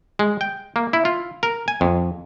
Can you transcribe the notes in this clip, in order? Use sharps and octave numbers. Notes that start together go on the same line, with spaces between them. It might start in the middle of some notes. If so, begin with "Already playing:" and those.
G#3
G5
A#3
E4
F4
A#4
G#5
F2